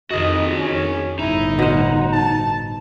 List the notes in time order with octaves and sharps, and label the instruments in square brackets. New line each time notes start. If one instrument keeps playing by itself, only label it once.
[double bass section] F2 D#3 [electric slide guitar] F#4 G#4 [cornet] D#5
[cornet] C#4
[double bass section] G1 A2 [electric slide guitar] D#4 [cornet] E4
[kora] B2 C5 [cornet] F#5
[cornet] A5